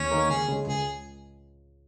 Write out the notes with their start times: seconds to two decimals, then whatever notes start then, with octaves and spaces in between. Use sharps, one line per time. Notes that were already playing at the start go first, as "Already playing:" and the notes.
Already playing: D#2 C#4
0.11 D#3 A#3 D#4 A#4
0.30 C#2 G#4
0.49 C#3 G#3
0.67 C#2 G#4